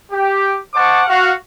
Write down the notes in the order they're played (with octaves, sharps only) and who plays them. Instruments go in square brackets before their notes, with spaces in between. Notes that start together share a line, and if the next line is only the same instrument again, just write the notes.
[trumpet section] G4
C5 D#5 F#5 A5 C#6 D6
F#4 F5